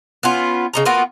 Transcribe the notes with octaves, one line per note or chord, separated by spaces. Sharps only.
B3 C#4 F4
C#3 D#4 A#5
A#3 B3 F4 F#4